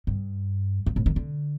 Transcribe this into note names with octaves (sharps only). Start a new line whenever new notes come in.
G2
G2
A2
D#3
D3